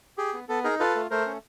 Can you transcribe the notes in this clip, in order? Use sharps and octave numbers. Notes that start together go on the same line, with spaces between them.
G4 G#4
B3
B3 A4
D#4 G#4 A#4
F4 A4 B4
A3
A3 A#4 C5
C#4